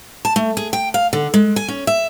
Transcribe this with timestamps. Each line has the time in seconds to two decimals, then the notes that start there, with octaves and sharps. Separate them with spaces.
0.25 A5
0.36 A3
0.57 G#4
0.73 G5
0.94 F5
1.13 D3
1.34 G#3
1.56 G#5
1.68 C#4
1.87 E5